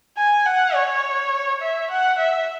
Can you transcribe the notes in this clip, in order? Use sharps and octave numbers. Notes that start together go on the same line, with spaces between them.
G#5
F#5
C#5
E5
F#5
E5